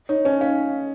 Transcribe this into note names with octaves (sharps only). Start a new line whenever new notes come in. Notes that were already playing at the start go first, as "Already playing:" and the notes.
D#4 C#5
C#4 D#4
C#4 F5